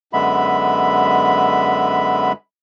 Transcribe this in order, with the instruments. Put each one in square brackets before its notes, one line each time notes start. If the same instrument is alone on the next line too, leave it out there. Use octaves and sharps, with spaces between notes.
[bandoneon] F#2 D3 G#3 B3 E5 B5